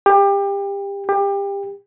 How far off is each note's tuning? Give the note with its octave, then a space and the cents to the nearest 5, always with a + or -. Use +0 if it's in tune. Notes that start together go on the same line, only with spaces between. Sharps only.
G4 +25
G4 +25